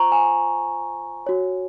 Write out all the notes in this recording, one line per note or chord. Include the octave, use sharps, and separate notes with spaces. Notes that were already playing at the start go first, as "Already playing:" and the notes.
Already playing: F4 C5 A#5 C#6
G#5
F#4 C#5